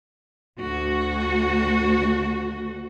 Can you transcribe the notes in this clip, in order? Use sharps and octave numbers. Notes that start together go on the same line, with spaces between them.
D2 F#4